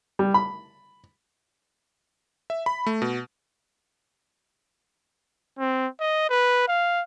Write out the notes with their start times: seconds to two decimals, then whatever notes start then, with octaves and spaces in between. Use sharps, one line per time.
0.19 G3
0.34 B5
2.50 E5
2.66 B5
2.87 A3
3.02 B2
5.59 C4
6.00 D#5
6.30 B4
6.68 F5